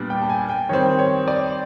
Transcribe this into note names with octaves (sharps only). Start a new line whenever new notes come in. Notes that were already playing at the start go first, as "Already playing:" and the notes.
Already playing: A#2 G3 B3 D4
G5
A5
G#5
G5
D#3 G3 C4 C#5
C#5
D5